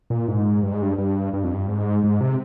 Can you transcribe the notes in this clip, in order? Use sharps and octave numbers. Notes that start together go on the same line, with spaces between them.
A#2
G#2
G2
G#2
G2
G2
G2
F2
G2
G#2
G#2
C3